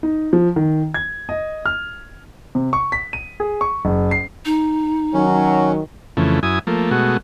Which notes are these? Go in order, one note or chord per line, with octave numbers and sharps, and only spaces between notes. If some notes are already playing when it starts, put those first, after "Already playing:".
D#4
F3
D#3
G#6
D#5
F6
C3
C#6
B6
D#7
G#4
C#6
F#1
C7
D#4
D#3 F#3 C#4
F2 C#3 E3 A3
F#2 E4 G#5 D#6
F3 A3 A#3
B2 G#3 A3 F#4